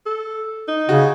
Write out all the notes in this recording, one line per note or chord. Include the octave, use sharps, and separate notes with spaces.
A4
D#4
C#3 F#4